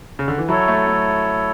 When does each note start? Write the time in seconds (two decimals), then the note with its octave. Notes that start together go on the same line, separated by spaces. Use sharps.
0.19 C#3
0.28 D3
0.38 E3
0.49 F#3 E4 A4 C#5
0.68 A3
0.87 A3